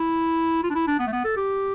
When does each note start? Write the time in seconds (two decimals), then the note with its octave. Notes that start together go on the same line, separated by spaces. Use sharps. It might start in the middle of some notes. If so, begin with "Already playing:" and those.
Already playing: E4
0.63 F4
0.70 D4
0.75 E4
0.87 D4
1.00 B3
1.07 A3
1.12 B3
1.24 A4
1.36 G4